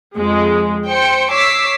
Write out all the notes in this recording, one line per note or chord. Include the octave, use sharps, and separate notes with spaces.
F2 G#3
C5 G5 C#7
C#5 D6 E6 B6 C7